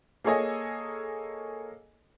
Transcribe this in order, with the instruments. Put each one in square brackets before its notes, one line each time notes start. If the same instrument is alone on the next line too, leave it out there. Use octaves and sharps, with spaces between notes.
[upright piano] A#3 G#4 A4 C#5 D#5 G#5